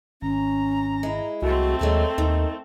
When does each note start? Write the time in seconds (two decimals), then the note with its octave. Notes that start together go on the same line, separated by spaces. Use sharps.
0.22 G#1 C#4 A#5
1.03 G#3 E4
1.42 C2 A3 C4 F#4
1.81 D#2 A#2 F#3 G#3 A4
2.18 D#2 D#3